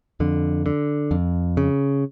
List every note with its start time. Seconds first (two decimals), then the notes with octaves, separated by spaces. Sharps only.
0.20 F2 D3
0.66 D3
1.11 F2
1.57 C#3